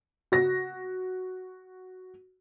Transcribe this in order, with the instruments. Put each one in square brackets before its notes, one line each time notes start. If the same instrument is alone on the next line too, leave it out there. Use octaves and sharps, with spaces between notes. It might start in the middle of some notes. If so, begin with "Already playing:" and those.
[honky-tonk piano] F#4 A#6